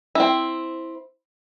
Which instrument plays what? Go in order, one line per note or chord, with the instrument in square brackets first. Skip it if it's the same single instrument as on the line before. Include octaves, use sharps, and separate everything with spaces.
[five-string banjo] C4 E4